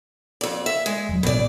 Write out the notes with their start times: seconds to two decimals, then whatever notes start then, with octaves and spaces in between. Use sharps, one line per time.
0.41 F2 D5
0.66 E5
0.86 G#3
1.09 E1 F#3
1.23 A1 E2 B2 D5